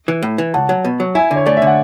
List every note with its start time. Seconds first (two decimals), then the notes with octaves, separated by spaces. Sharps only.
0.08 E3
0.23 A2
0.38 E3
0.54 C#2 F#5 A5
0.69 F#3
0.85 B2
1.00 F#3
1.15 E4 E5 G#5
1.31 D3
1.36 C#5
1.46 A3 D5
1.57 E5
1.62 D3 F#5